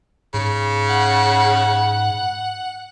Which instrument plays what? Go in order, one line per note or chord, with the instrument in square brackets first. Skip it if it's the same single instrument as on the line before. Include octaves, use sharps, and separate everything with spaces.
[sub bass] G#2 [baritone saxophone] C#3
[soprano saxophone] F#5